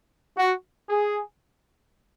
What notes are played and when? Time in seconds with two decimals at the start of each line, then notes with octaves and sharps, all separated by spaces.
0.37 F#4
0.88 G#4